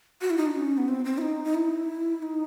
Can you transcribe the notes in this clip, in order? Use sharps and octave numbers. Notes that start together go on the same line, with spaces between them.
F#4
E4
D#4
D4
C#4
B3
C4
C4
E4
D#4
D#4
E4
D#4